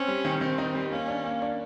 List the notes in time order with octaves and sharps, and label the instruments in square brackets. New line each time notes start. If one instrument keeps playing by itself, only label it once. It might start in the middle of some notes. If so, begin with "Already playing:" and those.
Already playing: [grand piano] C4 [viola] C#4
[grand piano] G3
D#3
[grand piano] D#3 [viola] C4
[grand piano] D#4
G3
[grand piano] A#3 [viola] C#4
[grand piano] D4
A#3
D4